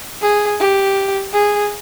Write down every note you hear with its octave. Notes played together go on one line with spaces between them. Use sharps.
G#4
G4
G#4